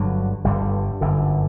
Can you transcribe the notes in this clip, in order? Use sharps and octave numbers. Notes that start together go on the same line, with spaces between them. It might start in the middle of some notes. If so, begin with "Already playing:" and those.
Already playing: G1 G2 D3 F#3
G1 G2 D3 G3
G1 F#2 D3